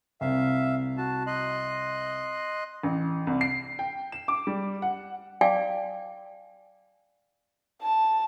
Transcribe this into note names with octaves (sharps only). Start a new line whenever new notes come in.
C2 E5 F5
F#4 A5
D#5 C6 F#6
A1
C2
C7
G5
E7
D6
G3
F#5
D5 F5 G5 G#5 D6
A5